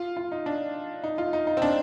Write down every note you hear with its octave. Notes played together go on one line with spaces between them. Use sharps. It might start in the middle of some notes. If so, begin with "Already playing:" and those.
Already playing: F4
F4
D#4
D4
D#4
F4
D#4
D#4
C4
D4